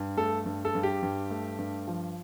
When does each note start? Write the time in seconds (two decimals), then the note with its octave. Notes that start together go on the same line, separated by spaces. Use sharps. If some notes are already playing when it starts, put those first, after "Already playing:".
Already playing: G2
0.17 A3 A4
0.46 G2
0.65 A4
0.75 G2
0.83 G4
1.03 G2
1.30 A3
1.58 G2
1.88 F3